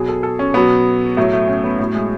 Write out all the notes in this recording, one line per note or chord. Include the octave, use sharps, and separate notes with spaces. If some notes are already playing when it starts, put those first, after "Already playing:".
Already playing: B2 F#3 G#4
A4
A4
C#4
B2 F#3 B3
A2 F#3 A3
A3
C#4
B3
A2 F#3 A3
G#3